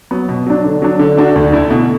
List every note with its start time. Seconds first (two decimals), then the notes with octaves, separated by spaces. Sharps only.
0.11 F#3 B3
0.29 B2
0.47 F#3 D4
0.65 D3
0.82 F#3 D4
0.99 D3
1.17 A3 D4 F#4
1.36 D2
1.53 D3 A3 E4
1.70 B2